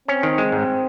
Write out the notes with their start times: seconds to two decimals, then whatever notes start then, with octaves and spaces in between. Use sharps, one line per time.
0.08 C4 C#4
0.23 D#3
0.38 G#3
0.52 G#2